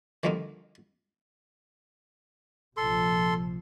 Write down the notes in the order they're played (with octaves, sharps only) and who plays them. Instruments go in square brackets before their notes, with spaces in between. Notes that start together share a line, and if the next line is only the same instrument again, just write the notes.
[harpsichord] D3 D#3 F3 G3 A#3 D#4
[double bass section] A#1 C3 F3 [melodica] A4 C6